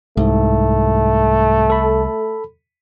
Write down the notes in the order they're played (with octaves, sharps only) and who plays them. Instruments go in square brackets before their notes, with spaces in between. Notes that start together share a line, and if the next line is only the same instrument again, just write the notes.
[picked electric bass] C2 [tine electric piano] G#2 [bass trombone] A3
[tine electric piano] A4 B5